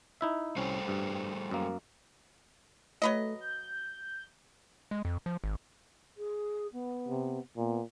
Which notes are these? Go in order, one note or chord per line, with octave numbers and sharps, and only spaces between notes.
D#4 E4 E5
C2 G3 A3 C#4 C5
G2
F#2 A#3
F#3 A3 B4 D#5
G6
G#3
F2
F3
G#1
G#4
B3
C3
A#2 B3